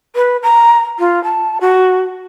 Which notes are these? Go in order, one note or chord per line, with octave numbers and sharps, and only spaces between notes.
B4
A#5
F4
A5
F#4